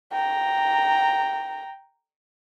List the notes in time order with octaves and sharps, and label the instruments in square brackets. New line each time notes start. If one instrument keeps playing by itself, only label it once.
[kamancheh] G5 A#5